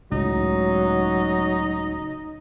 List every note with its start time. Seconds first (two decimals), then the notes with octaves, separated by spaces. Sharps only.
0.12 C#2 A2 F#3 D#4